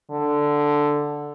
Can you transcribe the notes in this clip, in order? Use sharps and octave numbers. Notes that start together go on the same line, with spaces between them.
D3